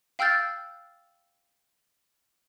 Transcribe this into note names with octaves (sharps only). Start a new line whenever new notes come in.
F5 G5 E6 F6 G6 A6